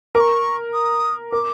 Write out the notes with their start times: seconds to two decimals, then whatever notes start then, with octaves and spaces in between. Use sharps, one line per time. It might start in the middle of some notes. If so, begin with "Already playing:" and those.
0.15 A#4 D6
0.20 C#6
0.73 D#6
1.32 A#4 D6